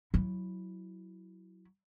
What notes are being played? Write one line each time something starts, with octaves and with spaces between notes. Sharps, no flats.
F#3 E4